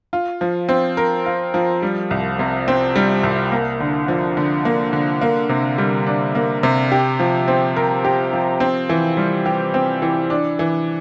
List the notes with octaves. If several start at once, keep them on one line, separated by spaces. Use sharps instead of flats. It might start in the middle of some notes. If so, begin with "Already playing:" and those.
F4
F3
C4
A#4
F4
F3
G3
C2
C3
C4
G3
C2
A#3
D3
F3
D3
A#3
D3
A#3
C3
G3
D4
A#3
C3
G4
F3
C4
A#4
G4
F3
C4
E3
G3
G4
C4
E3
D4
E3